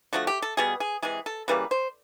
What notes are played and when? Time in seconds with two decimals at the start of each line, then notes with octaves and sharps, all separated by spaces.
0.13 D3 F3 A3 F#4
0.27 G4
0.42 A4
0.57 B2 G3 B3 G#4
0.80 G#4
1.02 C3 E3 G#3 G#4
1.26 A4
1.48 C#3 E3 G3 A#3 B4
1.71 C5